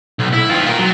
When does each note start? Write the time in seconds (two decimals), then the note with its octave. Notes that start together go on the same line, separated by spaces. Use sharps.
0.20 B1
0.33 E4
0.50 D#3 F4
0.66 F4 A#4
0.79 F#3